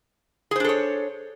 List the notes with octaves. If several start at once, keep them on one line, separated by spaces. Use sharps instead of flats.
D4 G#4 A4 C5 C#5